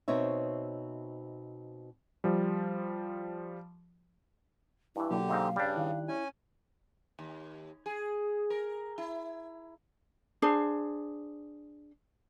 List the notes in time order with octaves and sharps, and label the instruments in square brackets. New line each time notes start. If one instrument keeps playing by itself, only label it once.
[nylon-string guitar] B2 C4 D#4 C5 C#5 E5
[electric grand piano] F3 G3
[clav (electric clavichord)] G2 E3 [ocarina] E4
[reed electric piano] B2 F#3 A#3 [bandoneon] D3 G4
[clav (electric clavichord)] G#2 C4 D#4 [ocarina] F5
[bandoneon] G2 C#3 [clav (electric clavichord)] G3 D4
[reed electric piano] D#3 E4 F#6
[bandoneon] C#4 G#5 [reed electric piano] E4
[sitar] D#2
G#4
A#4
E4
[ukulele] D4 G#4 C5